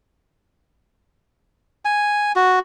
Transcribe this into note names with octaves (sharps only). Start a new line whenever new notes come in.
G#5
F#4